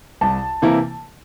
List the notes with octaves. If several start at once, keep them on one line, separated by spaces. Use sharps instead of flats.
C2 A5
C3 E3 A#3 E4